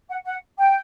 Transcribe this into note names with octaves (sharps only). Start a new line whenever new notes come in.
F#5
F#5
G5